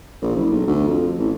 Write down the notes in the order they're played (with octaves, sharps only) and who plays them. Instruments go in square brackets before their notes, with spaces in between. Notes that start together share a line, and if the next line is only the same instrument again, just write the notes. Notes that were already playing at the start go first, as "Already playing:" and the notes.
[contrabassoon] A#1
F#1
B1
D2
F2
A1